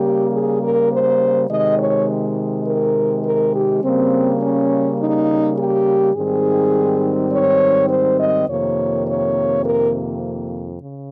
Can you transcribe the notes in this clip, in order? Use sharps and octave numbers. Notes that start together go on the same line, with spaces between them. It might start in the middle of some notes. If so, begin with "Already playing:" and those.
Already playing: C#3 G3 A#3 G4
G#4
A#4
C5
C3 D#3 G#3 D#5
C#5
A#4
A#4
G4
C#3 G3 A#3 C4
C#4
D#4
G4
G#2 D#3 G3 C4 G#4
C#5
C5
D#5
F2 C3 D#3 A#3 C#5
C#5
A#4
C#3